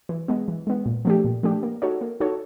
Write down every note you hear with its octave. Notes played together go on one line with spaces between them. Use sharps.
E3
G#3 B3
E3
G#3 B3
A#2
F3 A3 D4 G4
A#2
F3 A3 D4 G4
A#3
D#4 F#4 A4 C#5
A#3
D#4 F#4 A4 C#5